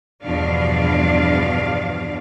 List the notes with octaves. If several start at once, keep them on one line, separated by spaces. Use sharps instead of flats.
E2 G2 B2 F3 D4 F5